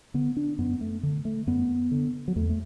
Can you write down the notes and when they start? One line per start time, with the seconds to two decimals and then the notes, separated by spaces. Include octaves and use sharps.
0.14 D3 B3
0.37 D4
0.58 F#2 B3
0.81 A3
1.03 D3
1.25 A3
1.47 F#2 B3
1.91 D3
2.28 F#3
2.36 E2 A3
2.50 A3